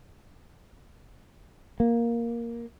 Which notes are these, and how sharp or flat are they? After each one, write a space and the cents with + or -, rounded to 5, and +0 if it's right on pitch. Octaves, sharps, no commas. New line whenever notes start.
A#3 +5